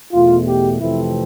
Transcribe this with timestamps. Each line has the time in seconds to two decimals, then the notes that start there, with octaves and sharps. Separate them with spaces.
0.13 E2 B2 A3 F4
0.46 G4
0.79 F2 C3 E3 A3 C4 E4